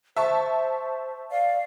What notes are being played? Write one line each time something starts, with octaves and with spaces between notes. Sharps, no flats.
C5 E5 A5 C#6
D5 F5